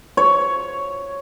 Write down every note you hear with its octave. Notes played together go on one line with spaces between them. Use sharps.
C#5